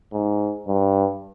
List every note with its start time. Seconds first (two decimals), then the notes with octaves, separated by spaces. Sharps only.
0.13 G#2
0.68 G2